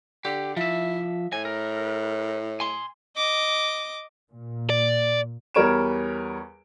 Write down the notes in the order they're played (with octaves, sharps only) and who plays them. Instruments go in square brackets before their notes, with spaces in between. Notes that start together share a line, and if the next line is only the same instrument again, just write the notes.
[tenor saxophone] D3 [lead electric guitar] G4
[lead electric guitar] F3 E5 [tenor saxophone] E4
[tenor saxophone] A2 [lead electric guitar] G#5
[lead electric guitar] A#4
G#5 C6
[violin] D#5 D6
[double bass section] A#2
[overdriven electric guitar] D5
[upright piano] E2 G3 A#4 C#5 D7 E7